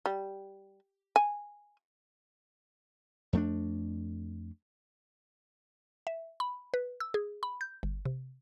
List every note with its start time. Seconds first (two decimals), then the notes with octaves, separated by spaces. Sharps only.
0.06 G3
1.16 G#5
3.33 F2 A3 D4
6.07 E5
6.40 B5
6.74 B4
7.00 E6
7.14 G#4
7.43 B5
7.61 G6
7.83 G1
8.05 C3